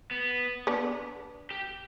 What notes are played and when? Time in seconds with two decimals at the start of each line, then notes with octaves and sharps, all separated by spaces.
0.11 B3
0.67 B3 D4
1.51 G4